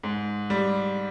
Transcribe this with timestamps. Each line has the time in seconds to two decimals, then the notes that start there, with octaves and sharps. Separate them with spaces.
0.03 G#2
0.50 G3